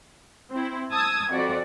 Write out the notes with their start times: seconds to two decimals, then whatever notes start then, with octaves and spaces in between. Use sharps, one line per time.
0.52 C4 E4
0.92 A5 D#6 E6 G#6
1.30 F2 F#4 D5